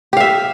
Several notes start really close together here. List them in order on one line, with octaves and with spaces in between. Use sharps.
G4 F5 E5